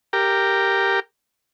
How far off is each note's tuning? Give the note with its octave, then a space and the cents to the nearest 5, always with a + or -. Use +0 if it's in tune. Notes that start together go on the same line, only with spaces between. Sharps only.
G4 +0 A#4 -5